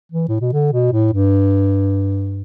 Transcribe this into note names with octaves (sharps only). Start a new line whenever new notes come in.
E3
A2
B2
D3
B2
A2
G2